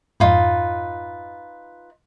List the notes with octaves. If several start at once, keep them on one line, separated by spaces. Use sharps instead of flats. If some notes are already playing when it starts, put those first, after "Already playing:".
F2 G#2 D#4 F4 B4